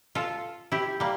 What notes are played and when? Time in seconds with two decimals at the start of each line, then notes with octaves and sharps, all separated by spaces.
0.15 F4 A4
0.72 E4 G4
1.00 G3 A#3